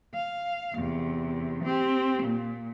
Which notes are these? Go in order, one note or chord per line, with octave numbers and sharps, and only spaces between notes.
F5
E2 C3
C4 G4
A#2